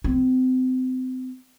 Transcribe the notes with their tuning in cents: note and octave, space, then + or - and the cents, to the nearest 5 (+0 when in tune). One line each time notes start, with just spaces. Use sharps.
C4 -30